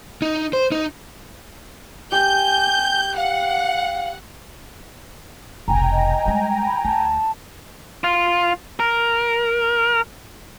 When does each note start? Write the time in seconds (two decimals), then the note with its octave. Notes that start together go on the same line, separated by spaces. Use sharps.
0.22 D#4
0.53 C5
0.72 D#4
2.12 G4 G#5 G6
3.17 F5 F#5
5.68 F1 B1 G5 G#5 A#5
5.92 D#5
6.26 G3 G#3
6.67 B5
6.85 D2 A5
8.04 F4
8.80 A#4